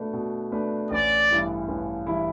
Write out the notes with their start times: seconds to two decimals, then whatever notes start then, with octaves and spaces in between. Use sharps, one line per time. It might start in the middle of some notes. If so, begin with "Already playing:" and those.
Already playing: B2 A3 D4 B4 D5
0.13 B2
0.52 A3 D4 B4 D5
0.90 A1 D5
1.30 G2 E3 G3 E4
1.68 A1
2.07 G2 E3 G3 E4